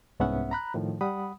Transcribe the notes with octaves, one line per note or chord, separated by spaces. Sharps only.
C2 G#2 B3 C#4 E5 F#5
A#5 B5 F#6
A2 D#3 F3
G3 F#5 B5 D#6